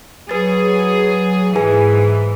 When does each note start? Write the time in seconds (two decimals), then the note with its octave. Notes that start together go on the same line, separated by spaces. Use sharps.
0.29 F#3 G#4 B4 A6
1.55 G#2 E3 G#4 B4 G#5